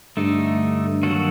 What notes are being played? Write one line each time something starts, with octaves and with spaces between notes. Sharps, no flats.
G2 D3 A3 D#4
D#3 F#3 A#3 F#4 A4